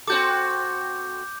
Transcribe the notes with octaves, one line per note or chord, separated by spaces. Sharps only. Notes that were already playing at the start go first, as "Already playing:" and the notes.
C4 F#4 A4 D6 G6